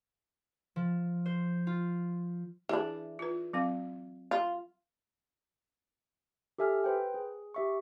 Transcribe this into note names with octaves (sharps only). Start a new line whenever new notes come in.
F3
C5
F4
E3 D4 G#4
F4 B4
F#3 C4 F5
F4
G4 A4 E5 G#5 F6
B4 C5 G5
G#4
G4 E5 C#6